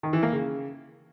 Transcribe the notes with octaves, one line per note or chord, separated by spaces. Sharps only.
D#3
E3
A#3
C#3